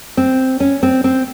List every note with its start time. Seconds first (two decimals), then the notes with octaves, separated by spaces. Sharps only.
0.17 C4
0.60 C#4
0.83 C4
1.04 C4